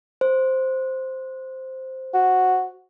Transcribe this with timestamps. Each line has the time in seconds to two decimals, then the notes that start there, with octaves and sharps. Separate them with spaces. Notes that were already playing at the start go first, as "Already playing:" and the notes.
0.21 C5
2.14 F#4